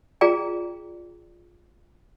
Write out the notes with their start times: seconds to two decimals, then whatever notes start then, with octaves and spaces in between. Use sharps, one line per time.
0.21 F4 G#4 D5 G5 A#5